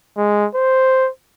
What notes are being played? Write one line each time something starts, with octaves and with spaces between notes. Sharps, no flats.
G#3
C5